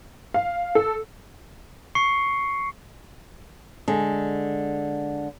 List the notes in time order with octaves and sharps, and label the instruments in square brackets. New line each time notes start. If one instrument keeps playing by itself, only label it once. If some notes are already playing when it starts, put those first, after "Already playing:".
[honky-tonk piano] F5
A4
[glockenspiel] C#6 C7 C#7
[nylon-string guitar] D3 G#3